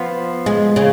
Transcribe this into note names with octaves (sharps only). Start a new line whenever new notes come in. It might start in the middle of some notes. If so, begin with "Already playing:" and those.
Already playing: F3 B3 F4
G#3
C#3